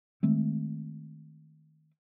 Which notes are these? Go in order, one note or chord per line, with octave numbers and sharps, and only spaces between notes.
D#3 G#3 A3 C4